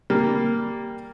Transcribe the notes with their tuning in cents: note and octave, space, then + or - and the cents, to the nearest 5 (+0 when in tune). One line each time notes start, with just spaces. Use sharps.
G3 +0 A#3 +0